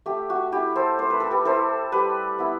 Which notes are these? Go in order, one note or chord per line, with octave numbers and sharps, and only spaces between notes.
A3 G4
F#4
E4 G4
A4 C5
A3 C5
B4
A4
G4 B4
E4 A4 C5
G3 G4 B4
B3 E4